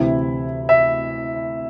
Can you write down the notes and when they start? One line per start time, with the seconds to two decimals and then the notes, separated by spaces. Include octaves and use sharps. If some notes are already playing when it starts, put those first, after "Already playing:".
Already playing: D2 C3 E3 E4
0.69 E5